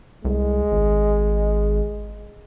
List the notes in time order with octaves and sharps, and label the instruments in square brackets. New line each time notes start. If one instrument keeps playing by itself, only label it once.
[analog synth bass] C2 [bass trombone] G#3
[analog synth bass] G#1